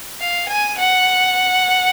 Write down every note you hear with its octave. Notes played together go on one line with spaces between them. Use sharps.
F5
G#5
F#5